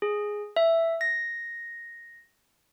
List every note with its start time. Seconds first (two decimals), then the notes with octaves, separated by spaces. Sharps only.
0.02 G#4
0.56 E5
1.01 A#6